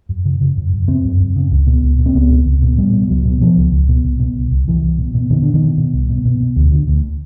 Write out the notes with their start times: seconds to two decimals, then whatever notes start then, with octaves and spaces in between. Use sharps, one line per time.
0.09 F#2
0.25 C#3
0.41 C#3
0.57 F#2
0.73 F#2
0.88 C#3 C4
1.05 F#2
1.20 F#2
1.36 C#3
1.51 C#2
1.67 B2
1.83 C#2
1.98 B2
2.06 C4
2.14 C#2 B3
2.30 B2
2.46 C#2
2.62 B2
2.78 B2 G3
2.93 B2
3.09 C#2 F#3
3.25 B2
3.41 B2 F3
3.57 C#2
3.72 C#2
3.88 B2
4.05 C2
4.20 B2
4.35 C2
4.51 C2
4.67 C2 E3
4.83 C2
4.98 B2
5.14 B2
5.30 B2 D#3
5.42 B2 D3
5.54 D#3
5.62 B2
5.77 B2
5.94 C2
6.09 B2
6.25 B2
6.40 B2
6.56 D2
6.72 D3
6.88 D2